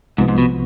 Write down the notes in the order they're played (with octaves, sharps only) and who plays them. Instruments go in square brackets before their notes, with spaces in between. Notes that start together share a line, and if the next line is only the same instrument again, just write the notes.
[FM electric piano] C2 C3 F3 B3 [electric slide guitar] G#2
[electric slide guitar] G#2
B2